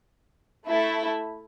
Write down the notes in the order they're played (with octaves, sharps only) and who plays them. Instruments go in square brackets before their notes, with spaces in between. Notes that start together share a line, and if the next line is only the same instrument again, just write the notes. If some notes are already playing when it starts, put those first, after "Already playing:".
[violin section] A3 E4 A4